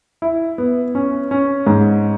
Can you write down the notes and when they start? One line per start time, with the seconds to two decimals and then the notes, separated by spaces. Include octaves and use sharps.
0.22 E4
0.58 B3
0.95 C#4
1.31 C#4
1.67 G#2